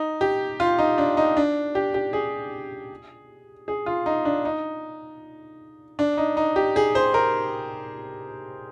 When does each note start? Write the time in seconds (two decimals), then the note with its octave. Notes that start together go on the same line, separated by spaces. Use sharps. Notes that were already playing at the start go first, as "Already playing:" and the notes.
Already playing: D#4
0.21 G4
0.60 F4
0.78 D#4
0.98 D4
1.17 D#4
1.37 D4
1.75 G4
1.94 G4
2.13 G#4
3.68 G#4
3.86 F4
4.06 D#4
4.25 D4
4.45 D#4
5.99 D4
6.17 D#4
6.37 D#4
6.56 G4
6.76 G#4
6.95 C5
7.14 A#4